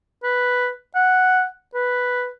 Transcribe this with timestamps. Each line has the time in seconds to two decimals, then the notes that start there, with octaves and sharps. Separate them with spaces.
0.23 B4
0.95 F#5
1.74 B4